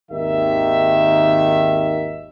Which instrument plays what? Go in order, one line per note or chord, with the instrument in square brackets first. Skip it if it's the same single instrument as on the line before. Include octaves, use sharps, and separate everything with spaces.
[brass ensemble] G#1 D#2 D#3 D#4 E5